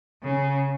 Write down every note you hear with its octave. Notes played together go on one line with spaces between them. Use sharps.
C#3